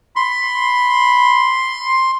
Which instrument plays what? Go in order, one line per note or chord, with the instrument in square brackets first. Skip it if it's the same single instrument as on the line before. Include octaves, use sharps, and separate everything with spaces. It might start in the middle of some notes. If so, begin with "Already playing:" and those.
[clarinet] B5 [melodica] C6